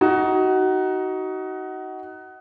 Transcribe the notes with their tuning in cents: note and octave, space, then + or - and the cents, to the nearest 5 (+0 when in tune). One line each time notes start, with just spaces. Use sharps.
D#4 +15 F#4 +20